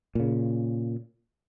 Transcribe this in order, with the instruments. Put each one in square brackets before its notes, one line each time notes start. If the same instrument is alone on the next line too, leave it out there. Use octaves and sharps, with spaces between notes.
[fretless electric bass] A#2 C#3